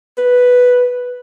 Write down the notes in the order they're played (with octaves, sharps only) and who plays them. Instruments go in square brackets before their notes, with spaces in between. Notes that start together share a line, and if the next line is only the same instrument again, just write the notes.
[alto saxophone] B4